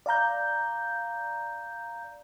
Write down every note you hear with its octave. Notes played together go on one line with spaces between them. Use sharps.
D5 F5 A#5 G6